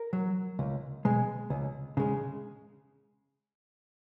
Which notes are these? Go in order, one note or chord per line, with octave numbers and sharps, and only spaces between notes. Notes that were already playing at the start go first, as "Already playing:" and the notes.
Already playing: A#4
F#3
C#2
B2 G#3
C#2
C#3 G#3